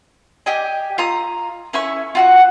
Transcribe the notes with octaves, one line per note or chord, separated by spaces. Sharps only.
G4 D5 D#5 G#5
F4 A#5 D#6
C#4 E4 G#5 C#6
F4 F#4 F#5